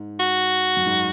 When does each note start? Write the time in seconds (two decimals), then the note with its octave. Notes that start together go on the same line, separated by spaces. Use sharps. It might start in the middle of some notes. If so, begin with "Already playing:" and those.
Already playing: G#2
0.20 F#4
0.77 F#2
0.86 G#2